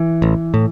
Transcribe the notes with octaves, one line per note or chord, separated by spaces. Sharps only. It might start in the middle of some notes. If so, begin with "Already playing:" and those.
Already playing: E3
A1
A2